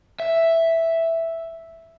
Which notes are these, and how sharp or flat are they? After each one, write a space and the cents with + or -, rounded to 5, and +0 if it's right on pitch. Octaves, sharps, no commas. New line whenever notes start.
E5 +0